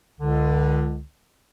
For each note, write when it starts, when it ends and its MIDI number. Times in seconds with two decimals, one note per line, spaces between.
0.20 1.02 37
0.20 1.02 50